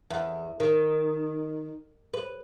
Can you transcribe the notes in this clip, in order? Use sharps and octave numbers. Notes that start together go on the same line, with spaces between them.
E2
D#3
B4